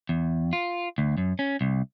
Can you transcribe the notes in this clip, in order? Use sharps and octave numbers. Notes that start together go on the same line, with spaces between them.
E2
F4
D2
F#2
C#4
C2